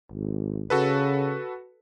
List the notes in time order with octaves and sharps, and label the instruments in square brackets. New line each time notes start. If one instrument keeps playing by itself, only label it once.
[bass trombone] G#1
[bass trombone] C#3 [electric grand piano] F#4 A4 B4